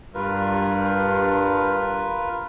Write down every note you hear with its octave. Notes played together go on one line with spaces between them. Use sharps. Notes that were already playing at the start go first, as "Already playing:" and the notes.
G2 F4 A#4 B4